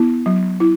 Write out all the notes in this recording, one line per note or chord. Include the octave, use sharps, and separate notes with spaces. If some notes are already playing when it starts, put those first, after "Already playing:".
Already playing: B3 E4
F#3
E4